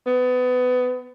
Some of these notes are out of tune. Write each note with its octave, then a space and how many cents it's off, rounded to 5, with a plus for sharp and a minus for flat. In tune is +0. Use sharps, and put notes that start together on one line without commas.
B3 +25